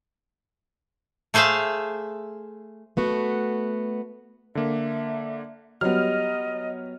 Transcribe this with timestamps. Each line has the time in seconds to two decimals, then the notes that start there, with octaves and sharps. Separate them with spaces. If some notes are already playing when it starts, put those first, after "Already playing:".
1.34 A3 G#4 C5 E5 F5
2.97 A3 B3 F#4
4.55 D3 A#3 E5
5.81 F#3 G3 B3 D#5 F6